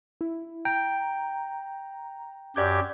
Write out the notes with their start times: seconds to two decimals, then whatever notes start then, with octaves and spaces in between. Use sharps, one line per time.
0.21 E4
0.65 G5 A#5
2.56 F#2 G4 D5 D6 G6 G#6